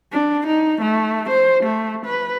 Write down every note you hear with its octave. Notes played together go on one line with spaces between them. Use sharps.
D4
D#4
A3
C5
A3
B4